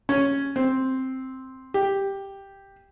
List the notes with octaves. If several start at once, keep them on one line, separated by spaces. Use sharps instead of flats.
C#4
C4
G4